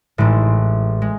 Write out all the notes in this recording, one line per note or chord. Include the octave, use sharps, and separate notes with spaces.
A1 A2 G#3
G#3